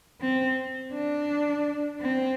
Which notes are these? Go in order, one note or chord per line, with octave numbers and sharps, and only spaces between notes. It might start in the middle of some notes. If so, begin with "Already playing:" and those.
C4
D4
C4